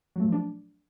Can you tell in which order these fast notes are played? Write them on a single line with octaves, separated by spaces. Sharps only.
F#3 A3 A#2 F3 D4